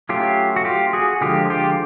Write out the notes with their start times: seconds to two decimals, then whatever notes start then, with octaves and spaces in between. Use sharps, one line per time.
0.09 F#3 A3 C#4 F4 G4
0.56 F#4
0.65 F4 G4
0.93 F#4 G#4
1.21 D3 F3 G#3 F4 G4
1.50 F4 G4